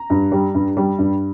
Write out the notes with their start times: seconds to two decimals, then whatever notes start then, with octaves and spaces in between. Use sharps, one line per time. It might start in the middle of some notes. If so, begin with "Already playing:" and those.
Already playing: A#5
0.10 G2
0.32 G3
0.55 G2
0.77 G3
0.99 G2